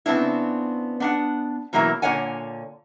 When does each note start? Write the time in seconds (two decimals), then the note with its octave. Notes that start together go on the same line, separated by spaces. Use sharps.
0.06 C#3 B3 C4 D4 E4
1.00 B3 D4 F#5
1.73 B2 E3 F#3 A#3 E4 A#4
2.02 A#2 D3 A#3 C#5 F#5 G#5